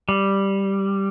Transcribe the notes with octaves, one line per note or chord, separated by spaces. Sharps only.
G3